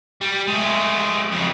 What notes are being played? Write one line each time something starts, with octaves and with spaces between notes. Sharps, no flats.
G3
G#3 A3
F2 C#3